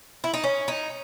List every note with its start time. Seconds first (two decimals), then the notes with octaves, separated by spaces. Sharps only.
0.24 E4
0.34 D#4
0.44 C#4
0.68 D#4